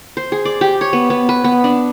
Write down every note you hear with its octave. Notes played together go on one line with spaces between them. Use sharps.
C5
G#4
D5
G4
C#5
B3
B3
B4
B3
D4